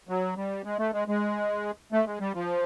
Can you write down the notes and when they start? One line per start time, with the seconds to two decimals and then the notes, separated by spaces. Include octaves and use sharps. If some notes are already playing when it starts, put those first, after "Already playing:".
0.09 F#3
0.37 G3
0.65 G#3
0.79 A3
0.93 G#3
1.08 G#3
1.92 A3
2.06 G#3
2.20 G3
2.34 F3